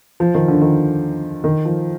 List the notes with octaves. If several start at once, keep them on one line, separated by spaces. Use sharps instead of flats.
F3
D#3
D3
D#3
D#3
F3